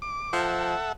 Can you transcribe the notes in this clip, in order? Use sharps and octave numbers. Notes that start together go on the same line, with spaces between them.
D6
F3 A4 E5 F#5